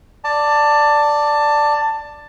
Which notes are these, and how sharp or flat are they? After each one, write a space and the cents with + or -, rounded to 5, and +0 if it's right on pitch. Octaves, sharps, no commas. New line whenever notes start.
D5 +0 A5 +15